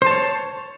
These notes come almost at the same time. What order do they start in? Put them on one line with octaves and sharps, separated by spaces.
C5 A5 C#5